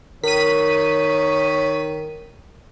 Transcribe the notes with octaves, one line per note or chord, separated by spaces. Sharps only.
D#3 A#4 C#5 B6 D#7